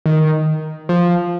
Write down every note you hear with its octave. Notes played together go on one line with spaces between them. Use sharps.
D#3
F3